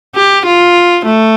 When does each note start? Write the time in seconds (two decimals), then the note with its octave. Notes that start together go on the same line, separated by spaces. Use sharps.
0.16 G4
0.46 F4
1.05 A3